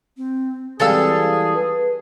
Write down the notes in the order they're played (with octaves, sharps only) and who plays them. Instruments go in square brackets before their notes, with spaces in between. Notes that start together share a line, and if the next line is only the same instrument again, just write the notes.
[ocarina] C4
[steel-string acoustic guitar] E3 G3 G#3 [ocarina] C4 [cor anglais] G#4 [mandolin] A4 F5 E6
[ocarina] B4